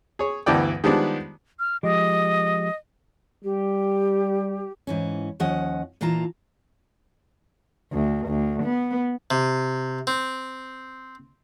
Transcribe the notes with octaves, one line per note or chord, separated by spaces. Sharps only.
G#4 C#5
D2 G2 E3 B3 D5 G5
D#3 F3 G3 G#3 B3 D4
F6
F3 G#3 G4 D#5
G3 G4
G#2 E3 C#4
D#2 F3 C#4 D#5 F#5
A#2 E3 A#3 F4 A5 A#5
D2
D2
B3
C3
C4